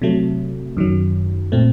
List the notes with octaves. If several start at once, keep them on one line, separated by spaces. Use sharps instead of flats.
C3 F#3 A3
F#2 D#3 F#3
A#2 A3 C4